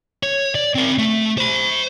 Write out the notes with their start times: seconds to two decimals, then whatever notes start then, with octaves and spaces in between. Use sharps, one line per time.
0.23 C#5
0.55 D5
0.75 C4 A#4
0.98 A3
1.38 C5 B5